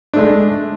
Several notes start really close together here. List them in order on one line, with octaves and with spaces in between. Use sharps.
D4 A3 G#3